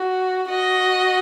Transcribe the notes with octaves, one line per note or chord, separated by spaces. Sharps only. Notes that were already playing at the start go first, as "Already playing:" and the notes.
Already playing: F#4
F#4 D#5